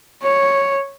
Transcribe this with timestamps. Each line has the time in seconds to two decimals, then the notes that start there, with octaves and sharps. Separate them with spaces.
0.23 C#5